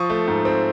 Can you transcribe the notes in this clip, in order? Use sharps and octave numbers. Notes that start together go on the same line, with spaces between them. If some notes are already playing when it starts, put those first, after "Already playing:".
Already playing: F3 C#6 D#6
A3
G#2
C4